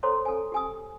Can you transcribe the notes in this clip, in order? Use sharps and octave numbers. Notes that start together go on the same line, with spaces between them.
A4 C5 C#5 A#5 C6
A4 G#5
G4 G#5 D#6